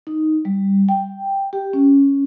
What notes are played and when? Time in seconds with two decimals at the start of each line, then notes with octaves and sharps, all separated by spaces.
0.07 D#4
0.45 G3
0.89 G5
1.53 G4
1.73 C#4